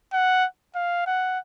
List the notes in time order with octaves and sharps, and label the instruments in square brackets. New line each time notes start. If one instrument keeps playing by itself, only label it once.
[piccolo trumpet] F#5
F5
F#5